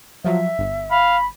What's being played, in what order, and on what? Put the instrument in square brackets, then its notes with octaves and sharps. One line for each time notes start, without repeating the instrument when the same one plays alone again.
[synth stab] F3 F#3 [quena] E5
[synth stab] G1
[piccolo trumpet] F5 [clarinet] B5